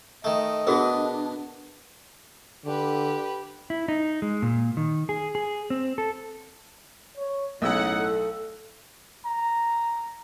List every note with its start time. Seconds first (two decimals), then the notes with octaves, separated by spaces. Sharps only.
0.24 D#3 A3 D#5
0.67 B2 B3 D4 F#4 G#4 A#4
2.65 D3 G4 B4
3.70 E4
3.88 D#4
4.22 G#3
4.42 A#2
4.77 D#3
5.09 G#4
5.35 G#4
5.70 C4
5.98 A4
7.17 C#5
7.62 B1 A2 C#3 D#4 F#5 E6
7.97 A4
9.25 A#5